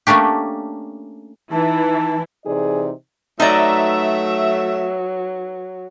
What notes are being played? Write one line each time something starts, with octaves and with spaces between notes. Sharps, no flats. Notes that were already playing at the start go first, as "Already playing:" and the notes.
A3 A#3 C#4 D4 G4
E3 D#4 E4 A5
C3 E3 D#4 G#4 D5
F#3 A3 D#4 B4 D5 E5 A#5